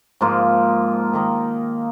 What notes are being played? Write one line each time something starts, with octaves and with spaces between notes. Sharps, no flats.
G#2 F3 A#3 F4
D#3 A#3 D#4